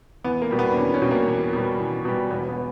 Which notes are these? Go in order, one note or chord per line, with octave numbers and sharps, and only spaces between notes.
E2 B3
A#3
B2 G3
B3
D4
E2 C#4
C#4
B2 G3
A#3
E2
B2 G3
E2
B2 G3
E1 B3
B3